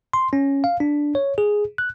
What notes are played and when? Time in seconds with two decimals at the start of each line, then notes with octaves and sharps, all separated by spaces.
0.13 C6
0.33 C#4
0.64 F5
0.80 D4
1.15 C#5
1.38 G#4
1.78 F#6